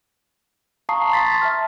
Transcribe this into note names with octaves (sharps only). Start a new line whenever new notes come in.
F5 A5 A#5 C#6 D#6 C7
C6 C#6 A6 B6
E5 A5 F6